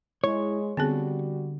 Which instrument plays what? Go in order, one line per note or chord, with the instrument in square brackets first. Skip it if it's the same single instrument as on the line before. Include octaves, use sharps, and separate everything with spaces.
[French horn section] G#3 [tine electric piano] E4 [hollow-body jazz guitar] C#5
[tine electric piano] D3 [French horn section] G3 F#4 [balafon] B3 C4 G#4